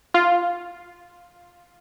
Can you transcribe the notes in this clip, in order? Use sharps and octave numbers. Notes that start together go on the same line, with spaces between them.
F4